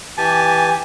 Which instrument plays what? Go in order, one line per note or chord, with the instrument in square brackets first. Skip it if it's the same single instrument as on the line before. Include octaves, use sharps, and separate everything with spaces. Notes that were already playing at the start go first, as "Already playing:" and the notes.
[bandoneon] E3 G#5 A5 [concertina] G4